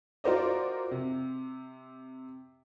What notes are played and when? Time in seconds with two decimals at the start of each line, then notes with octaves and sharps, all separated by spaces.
0.24 F4 F#4 A#4 C5 D5 D#5
0.91 C3